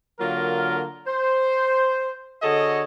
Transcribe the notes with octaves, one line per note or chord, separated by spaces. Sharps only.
D3 F#3 A#3 F4 A#4
C5
D3 F#4 G#4 A4 C#5 D#5